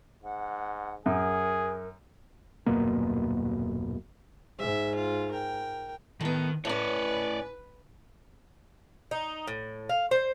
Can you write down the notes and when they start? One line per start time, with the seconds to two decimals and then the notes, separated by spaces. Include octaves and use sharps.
0.24 G#2 F#5
1.06 F#2 G#4 A#4
2.66 D#1 F#2 B2 A#3
4.59 G#2 E5
4.95 F4
5.31 A#4 G5
6.21 A2 D#3 B3
6.65 A2 C#4 B4 C#5 D5
9.11 D#4
9.47 A2
9.89 F5
10.11 C5